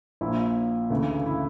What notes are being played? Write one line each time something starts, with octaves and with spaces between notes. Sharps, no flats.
A#1 A#2 E4
D2 C#3 E3
E4